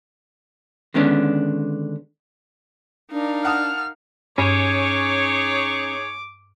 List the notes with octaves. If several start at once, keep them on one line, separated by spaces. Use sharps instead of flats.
D3 D#3 G#3 B3 C#4 D4
D4 D#4 A#4 F5
F#5 A5 D#6 F6
G2 C#4 D#4 G#4 C#5 D6